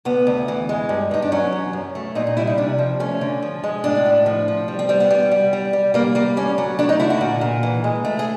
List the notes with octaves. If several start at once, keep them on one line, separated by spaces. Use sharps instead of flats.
D2 B3
D2
E3
G#3
G2
G2 D#4
D4
F#3 C#4
E2
F#2
A3
A#2 D#4
D#4
G3 E4
D#4
C3 D4
F3
A3 C#4
D3
F3
G#3
A2 D4
A2
F3
F3
G3
C4
G3 C4
B3
G3
G3
G3
G3
G3 A#3
G3 A#3
D2 C#4
F#3
A3 D4
D#4
D3 E4
F#4
A#2
A#2
E3
G#3
A3
G#4